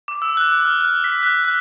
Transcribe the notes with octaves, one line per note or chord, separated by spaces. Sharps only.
D6
E6
F#6
E6
F6
F#6
B6
F#6
F#6